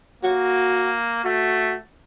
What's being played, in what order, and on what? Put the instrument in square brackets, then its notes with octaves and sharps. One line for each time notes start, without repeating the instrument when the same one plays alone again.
[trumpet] A#3 [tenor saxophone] F#4
[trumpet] A3 [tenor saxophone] F#4